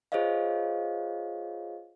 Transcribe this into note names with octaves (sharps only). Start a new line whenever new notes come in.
F4 G#4 C5 C#5 D#5 F5